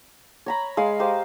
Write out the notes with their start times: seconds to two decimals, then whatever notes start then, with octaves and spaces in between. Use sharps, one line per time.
0.46 C#5 A#5 B5
0.77 G#3 F5
0.99 G4 C5 D#5 F5